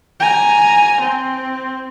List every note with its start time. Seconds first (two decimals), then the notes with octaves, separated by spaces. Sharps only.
0.20 G#5 A#5
1.00 C4